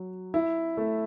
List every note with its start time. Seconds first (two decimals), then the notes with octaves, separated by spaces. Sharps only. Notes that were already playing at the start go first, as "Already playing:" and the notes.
Already playing: F#3
0.34 E4
0.77 A3